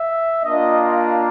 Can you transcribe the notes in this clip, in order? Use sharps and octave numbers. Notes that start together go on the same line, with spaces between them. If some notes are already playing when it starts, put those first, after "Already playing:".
Already playing: E5
A#3 D4 F4 D#5